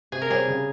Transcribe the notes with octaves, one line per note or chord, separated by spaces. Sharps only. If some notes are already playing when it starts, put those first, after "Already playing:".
C3 G#4
A#4
G3 C4 G4 G#4 C#5
C#3